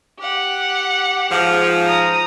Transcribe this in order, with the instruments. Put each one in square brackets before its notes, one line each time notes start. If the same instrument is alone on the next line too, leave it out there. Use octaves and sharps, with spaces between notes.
[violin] G4 F#5
[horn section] G#2 F3
[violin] A#5 D#6